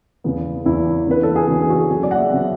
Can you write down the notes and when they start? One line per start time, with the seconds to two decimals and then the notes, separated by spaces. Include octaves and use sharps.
0.24 E2 C#3 E3 B3
0.66 E2 C#3 E3 B3 E4
1.07 C#3 E3 B3 D4 B4
1.23 A4
1.36 G#4
1.48 C#3 E3 B3 D4 F#4
1.62 G#4
1.70 F#4
1.76 G#4
1.89 C#3 F#3 B3 G#4
2.03 D5
2.11 F#5
2.17 E5
2.31 C#3 F#3 B3